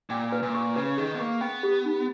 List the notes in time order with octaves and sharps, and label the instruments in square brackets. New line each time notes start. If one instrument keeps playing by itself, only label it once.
[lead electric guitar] A#2 [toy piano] G5
[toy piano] B4
[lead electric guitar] A#2
[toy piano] C#6
[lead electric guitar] C#3 [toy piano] B4
[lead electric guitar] D#3 [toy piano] G#4
[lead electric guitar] B3
[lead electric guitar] A#3 [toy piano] C#6
[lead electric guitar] B3 [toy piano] G5
[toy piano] G4
D#4